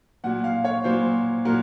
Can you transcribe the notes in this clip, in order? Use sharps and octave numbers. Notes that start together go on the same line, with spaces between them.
A#2 F#3 F#5
F5
C#5
A#2 F#3 C5
A#2 F#3 A#4